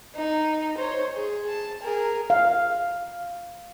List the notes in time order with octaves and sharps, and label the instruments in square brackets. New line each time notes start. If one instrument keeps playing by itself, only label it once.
[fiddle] D#4
C5 C#5
G#4
A5
G#4 A#4
[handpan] F5